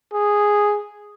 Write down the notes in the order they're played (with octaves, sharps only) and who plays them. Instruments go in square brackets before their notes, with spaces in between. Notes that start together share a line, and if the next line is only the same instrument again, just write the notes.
[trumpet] G#4